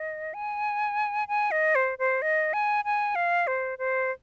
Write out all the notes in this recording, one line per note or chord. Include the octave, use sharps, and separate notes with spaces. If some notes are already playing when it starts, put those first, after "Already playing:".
Already playing: D#5
G#5
G#5
D#5
C5
C5
D#5
G#5
G#5
F5
C5
C5